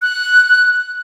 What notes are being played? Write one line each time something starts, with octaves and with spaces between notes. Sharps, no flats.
F#6